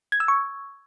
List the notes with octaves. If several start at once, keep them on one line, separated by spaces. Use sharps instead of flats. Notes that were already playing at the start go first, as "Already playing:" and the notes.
G#6
E6
C#6